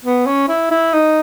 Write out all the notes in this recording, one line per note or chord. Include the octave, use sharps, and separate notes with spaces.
B3
C#4
E4
E4
D#4